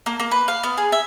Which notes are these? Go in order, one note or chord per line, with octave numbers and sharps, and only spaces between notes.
A#3
A#3
B4
F5
B3
G#4
E5